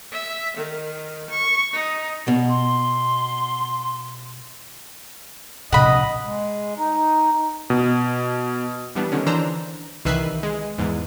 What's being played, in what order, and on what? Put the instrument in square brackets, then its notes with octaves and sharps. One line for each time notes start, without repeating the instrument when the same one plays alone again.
[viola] E5
D#3
C#6
D#4
[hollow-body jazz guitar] B2
[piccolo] C6
[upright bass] A#1 C3 [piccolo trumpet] D#5 [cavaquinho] F#5 B5
[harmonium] G#3
D#4
[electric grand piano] B2
[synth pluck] E3 G3 B3 D4
D3 D#3 C#4
E3 D4 C5 A#5 E6
C2 D#3 E3 B4 E5 C7
G#3
E2 G#2 E3